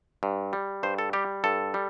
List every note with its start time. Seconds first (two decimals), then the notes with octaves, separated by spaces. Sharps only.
0.23 G2
0.53 G3
0.83 G2 C5
0.99 A4
1.13 G3 G4
1.44 G2 A4
1.74 G3